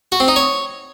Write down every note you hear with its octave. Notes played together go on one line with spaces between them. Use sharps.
F#4
C4
D#4
C#5